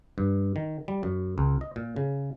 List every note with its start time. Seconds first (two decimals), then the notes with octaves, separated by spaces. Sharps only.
0.18 G2
0.56 D#3
0.88 G3
1.03 F#2
1.38 C#2
1.61 D#5
1.76 A#2
1.96 C#3